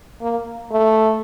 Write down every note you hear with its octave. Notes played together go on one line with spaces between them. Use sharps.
A#3
A3